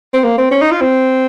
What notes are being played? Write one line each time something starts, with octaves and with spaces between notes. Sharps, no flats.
C4
A#3
C4
C#4
D#4
F4
C4